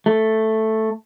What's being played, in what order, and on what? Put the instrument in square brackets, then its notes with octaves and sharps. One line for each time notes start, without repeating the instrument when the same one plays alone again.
[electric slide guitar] A3